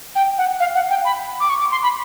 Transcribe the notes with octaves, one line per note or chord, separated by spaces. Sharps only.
G5
F#5
F5
F#5
G5
B5
D6
C#6
D6
C6
B5